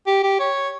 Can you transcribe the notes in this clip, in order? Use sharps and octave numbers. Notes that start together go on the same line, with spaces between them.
G4
G4
C#5